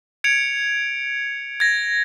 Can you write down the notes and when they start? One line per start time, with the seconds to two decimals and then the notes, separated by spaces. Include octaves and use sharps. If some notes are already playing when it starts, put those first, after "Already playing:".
0.24 G#6 C#7 D7 F7
1.60 G#6 A#6